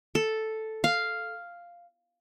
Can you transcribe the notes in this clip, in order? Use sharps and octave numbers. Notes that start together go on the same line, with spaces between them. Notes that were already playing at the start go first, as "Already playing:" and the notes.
A4
F5